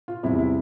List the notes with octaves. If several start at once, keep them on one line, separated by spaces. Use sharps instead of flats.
F4
E2 C3 G3 E4
E4